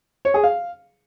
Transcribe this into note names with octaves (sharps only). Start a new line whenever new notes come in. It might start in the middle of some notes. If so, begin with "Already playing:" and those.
C#5
G#4
F5